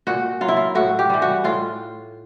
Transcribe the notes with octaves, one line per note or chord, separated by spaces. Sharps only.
A#2 F#4
F#3 F4
E4
F4
A2 F#4
G4
E3 G3
F#4
A2 F4